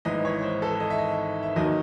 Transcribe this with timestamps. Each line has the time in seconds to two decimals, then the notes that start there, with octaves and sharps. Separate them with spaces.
0.05 G#1 G#2 E3 D#5
0.25 C#5
0.43 C5
0.62 A4
0.80 D#5
0.90 E5
0.98 D#5
1.43 E5
1.56 D#2 D#3 F#3 D#5